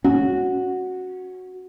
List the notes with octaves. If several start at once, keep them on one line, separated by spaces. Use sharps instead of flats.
C#4 F#4